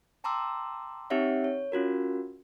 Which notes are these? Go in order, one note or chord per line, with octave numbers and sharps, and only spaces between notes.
G5 A5 A#5 C6 D6 E6
C4 D#4 G4 C#5 E5 F#5
C#5
C#4 F4 F#4 A#4